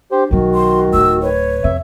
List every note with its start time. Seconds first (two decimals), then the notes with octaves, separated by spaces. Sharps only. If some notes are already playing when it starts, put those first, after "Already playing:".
0.12 D4 G4 C5
0.31 B1 D#3 F#3 F#4
0.54 C6
0.93 D1 D#4 E6
1.22 B4 C#5
1.64 F2 E5